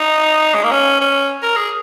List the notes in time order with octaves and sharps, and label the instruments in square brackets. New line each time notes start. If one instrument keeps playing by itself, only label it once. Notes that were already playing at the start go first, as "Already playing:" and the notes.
Already playing: [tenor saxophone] D#4
G#3
A#3
C#4
C#4
A#4
G#4